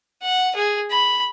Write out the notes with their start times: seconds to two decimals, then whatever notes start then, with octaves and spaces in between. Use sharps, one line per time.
0.22 F#5
0.55 G#4
0.91 B5